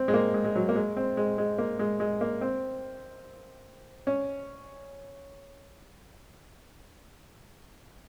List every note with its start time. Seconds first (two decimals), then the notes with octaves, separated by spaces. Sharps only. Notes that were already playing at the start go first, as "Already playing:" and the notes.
Already playing: C4
0.08 G#3
0.14 A#3
0.34 G#3
0.45 G#3
0.56 F#3
0.69 A#3
0.75 G#3
0.97 C4
1.17 G#3
1.38 G#3
1.58 A#3
1.79 G#3
2.00 G#3
2.21 A#3
2.41 C4
4.07 C#4